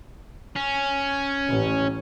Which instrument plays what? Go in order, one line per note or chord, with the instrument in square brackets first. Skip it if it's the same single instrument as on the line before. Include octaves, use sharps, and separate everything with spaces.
[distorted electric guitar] C#4
[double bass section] A1